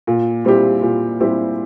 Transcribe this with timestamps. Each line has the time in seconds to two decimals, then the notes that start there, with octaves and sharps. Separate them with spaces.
0.07 A#2
0.45 G3 C4 E4 G4
0.83 A#2
1.20 G3 C4 E4 G4